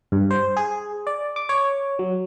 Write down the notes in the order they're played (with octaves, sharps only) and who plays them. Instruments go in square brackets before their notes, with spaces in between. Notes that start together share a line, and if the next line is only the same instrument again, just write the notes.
[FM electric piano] G2
C5
G#4
D5
D6
C#5
F#3